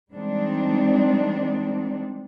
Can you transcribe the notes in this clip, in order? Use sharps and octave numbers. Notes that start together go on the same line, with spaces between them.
E3 G3 G#3 C4 D4 D#4